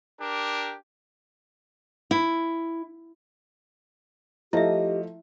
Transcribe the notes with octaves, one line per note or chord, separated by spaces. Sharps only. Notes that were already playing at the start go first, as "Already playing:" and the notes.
D4 G4 A#4
E4
F3 A3 E4 G4 D#5 E5